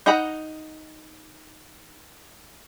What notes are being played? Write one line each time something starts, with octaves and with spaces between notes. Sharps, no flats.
D#4 D#5 F#5 A#5 B5